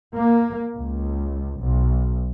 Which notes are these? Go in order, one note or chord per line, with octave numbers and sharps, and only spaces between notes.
A#3
C#2
B1